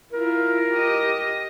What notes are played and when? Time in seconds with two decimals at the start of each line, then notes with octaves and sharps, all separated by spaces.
0.12 E4 F4 A#4
0.73 G4 D#5